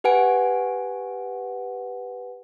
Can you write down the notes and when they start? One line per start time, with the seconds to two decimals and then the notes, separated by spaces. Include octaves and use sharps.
0.04 G4 B4 F#5 G#5 D7